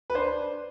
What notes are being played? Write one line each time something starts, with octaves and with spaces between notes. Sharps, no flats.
B4
D4 C5